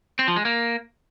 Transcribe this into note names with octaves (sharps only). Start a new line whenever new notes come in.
C4
F3
G#3
A#3